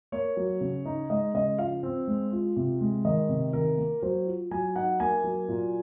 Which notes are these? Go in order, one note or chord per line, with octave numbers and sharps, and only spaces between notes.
A#3 C#5
F#3
C#3
D#4
G#3 D#5
C#3 D#5
F3 F5
C4
G#3
F4
C3
G#3
D#3 D#5
C3
D#3 A#4
A#3
F#3 C5
F4
F#3 G#5
D#4 F#5
A#3 G#5
F#3
A#2